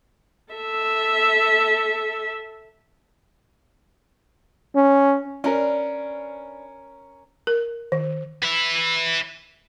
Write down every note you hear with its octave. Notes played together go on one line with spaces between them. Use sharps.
A4 E5
C#4
C#4 D4 A#4 B4
A#4
D#3
B4 E5